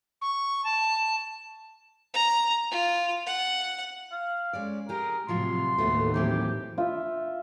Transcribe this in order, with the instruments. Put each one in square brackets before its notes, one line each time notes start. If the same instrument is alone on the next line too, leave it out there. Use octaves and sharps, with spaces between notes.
[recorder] C#6
A5
[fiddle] A#5
F4
F#5
[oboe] F5
[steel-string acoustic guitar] G#3 C#4 D5
[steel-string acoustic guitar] G4 G#4 [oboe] A#4
[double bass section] A2 C3 [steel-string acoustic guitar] F3 F#3 F4 [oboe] C6
[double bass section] D#2 A2 [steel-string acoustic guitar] A3 B3 F#4
[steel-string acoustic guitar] E3 F#3 C4 [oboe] G4
[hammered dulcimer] F4 E5